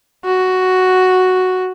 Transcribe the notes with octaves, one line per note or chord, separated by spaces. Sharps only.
F#4